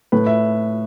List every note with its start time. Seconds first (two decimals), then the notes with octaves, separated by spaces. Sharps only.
0.12 A2 B4
0.27 E5